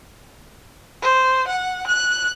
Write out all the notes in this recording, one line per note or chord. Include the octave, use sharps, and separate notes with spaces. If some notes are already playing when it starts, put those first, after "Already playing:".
C5
F#5
F#6